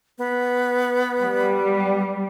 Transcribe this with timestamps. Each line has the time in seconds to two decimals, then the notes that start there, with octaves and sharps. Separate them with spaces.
0.18 B3
1.21 G3